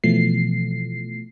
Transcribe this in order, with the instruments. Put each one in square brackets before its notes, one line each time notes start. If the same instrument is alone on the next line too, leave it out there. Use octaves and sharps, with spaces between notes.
[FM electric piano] B2 E3 F3 A3 C7